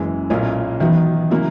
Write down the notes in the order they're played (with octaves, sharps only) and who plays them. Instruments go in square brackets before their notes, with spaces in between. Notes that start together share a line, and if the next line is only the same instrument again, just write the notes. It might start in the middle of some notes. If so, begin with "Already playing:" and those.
Already playing: [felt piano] F#1 F#2 E3 G#3
B1 A#2 A#3 C#4 E4
[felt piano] D#3 F#3 B3 [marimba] E3
[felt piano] C#3 F#3 A#3 E4